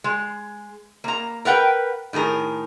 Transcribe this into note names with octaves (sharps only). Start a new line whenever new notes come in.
G#3
A#3 A#5
A#4 B4 F#5 G5
A2 D#3 G#4 A#4